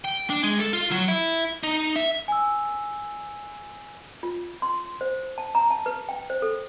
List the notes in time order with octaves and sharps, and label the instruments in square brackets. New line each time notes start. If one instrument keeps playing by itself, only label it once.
[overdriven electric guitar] G5
D4
G#3
A4
F4
F#3
E4
D#4
E5
[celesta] G#5 E6
[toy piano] F4
C6
C5
A5
A#5
A5
B4
G5
C5
A4